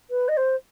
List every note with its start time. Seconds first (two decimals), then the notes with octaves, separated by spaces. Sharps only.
0.10 B4
0.28 D#5
0.37 C5